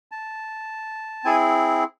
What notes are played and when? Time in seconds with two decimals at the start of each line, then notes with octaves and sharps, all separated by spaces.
0.12 A5
1.24 C4 E4 G#4 G#5